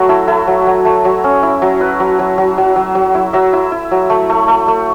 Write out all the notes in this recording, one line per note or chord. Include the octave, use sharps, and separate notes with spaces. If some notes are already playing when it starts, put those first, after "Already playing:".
Already playing: F#3 A3 F#4
E4 A4
E4 A4
F#3
F#3
A3
F#3
C#4
E4
F#3
E4 B4
F#3
F#3
F#3
F#3
F#3
F#3
E4
F#3 E5
E4
E4
F#3
A3
A3
A3
A3